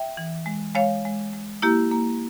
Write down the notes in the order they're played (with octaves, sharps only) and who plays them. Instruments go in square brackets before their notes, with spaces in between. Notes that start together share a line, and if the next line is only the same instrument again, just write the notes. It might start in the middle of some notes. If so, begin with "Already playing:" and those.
Already playing: [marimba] E5 G5
E3
G#3
G#3 C#5 F5
G#3
G#3
A#3 E4 G4
A#3